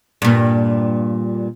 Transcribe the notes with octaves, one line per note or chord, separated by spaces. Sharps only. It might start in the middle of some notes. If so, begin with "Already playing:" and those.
G2 A#2